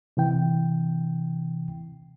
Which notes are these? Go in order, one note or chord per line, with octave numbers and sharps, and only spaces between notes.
C3 E3 G5